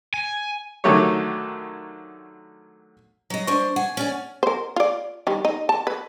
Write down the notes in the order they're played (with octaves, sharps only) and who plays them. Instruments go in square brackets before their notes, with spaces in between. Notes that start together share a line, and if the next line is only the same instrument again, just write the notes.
[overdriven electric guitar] G#5
[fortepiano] D3 D#3 F#3 A3 G4 C#5
[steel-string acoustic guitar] F#3 D#5
[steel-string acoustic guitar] D4 C5 [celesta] C#6
[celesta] F#5 [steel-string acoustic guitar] G#5
[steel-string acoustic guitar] C#4 D5 G#5
[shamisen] A#4 C5
F4 D5
D#3 G3
D#4
A5
B4